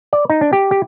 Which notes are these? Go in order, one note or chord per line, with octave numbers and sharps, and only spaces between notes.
D5
D#4
D4
G4
G4